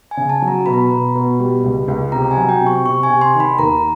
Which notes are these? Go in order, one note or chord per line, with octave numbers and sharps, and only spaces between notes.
G#5
C#3
A5
F#3
A#5
B2 B5
A#5
B5
B2
B2
G3
C#2
C#2
C3 A#5
G#5
F#3
G5
C3
C#6
C3 C#6
G#5
C3
C6
D#3
B5
D#2 A#5